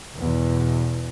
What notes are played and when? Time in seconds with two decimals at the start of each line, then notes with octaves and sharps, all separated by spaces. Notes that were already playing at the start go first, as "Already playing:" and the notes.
0.17 E2 B2